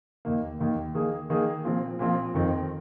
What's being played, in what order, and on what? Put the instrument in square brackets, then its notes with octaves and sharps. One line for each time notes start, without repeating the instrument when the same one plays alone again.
[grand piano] D#2 D#3 A#3
D#2 D#3 A#3
D#3 A#3 G#4
D#3 A#3 G#4
A#2 F3 C4 F4
A#2 F3 C4 F4
F2 D#3 C4